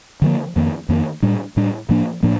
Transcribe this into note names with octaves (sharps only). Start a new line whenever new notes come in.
D3 F3 A#3
F2 D#3 A#3
F2 D#3 A#3
A2 G3 D4
A2 G3 D4
A2 F3 A#3 D4
A2 F3 A#3 D4